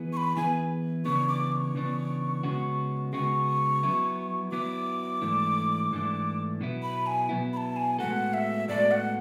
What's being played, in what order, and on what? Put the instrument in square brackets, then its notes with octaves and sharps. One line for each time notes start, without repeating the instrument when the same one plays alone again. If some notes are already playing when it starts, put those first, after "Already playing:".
Already playing: [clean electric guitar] E3 B3 E4 G#4 B4
[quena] C#6
B5
[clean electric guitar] E3 B3 E4 G#4 B4 [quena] G#5
[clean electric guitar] C#3 E3 B3 D4 [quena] C#6
[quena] D6
C#6
[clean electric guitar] C#3 E3 B3 D4
C#3 G#3 B3 F#4
[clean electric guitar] C#3 G#3 B3 F#4 [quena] C#6
[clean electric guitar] F#3 B3 E4
[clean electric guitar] F#3 B3 E4 [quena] D6
[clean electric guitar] G#2 E3 A3 D4
G#2 E3 A3 D4
B2 F#3 B3 E4
[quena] B5
G#5
[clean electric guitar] B2 F#3 B3 E4
[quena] B5
A5
G#5
[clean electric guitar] A2 G#3 B3 F#4 A4 [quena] F#5
[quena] E5
[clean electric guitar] A2 G#3 B3 F#4 A4 [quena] D5
[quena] F#5